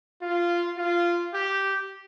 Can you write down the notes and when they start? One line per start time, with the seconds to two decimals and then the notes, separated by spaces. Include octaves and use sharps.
0.22 F4
0.78 F4
1.34 G4